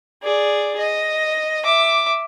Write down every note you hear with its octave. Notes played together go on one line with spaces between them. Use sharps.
G#4 D5
D#5
E5 D6